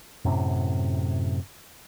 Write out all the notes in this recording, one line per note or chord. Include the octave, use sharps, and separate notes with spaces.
F#2 A2 C3